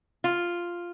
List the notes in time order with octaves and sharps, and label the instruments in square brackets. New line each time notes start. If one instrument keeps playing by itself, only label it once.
[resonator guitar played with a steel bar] F4